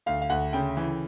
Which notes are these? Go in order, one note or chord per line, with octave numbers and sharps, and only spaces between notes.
D2 F5
F5
D2 F#5
C#3 G5
E3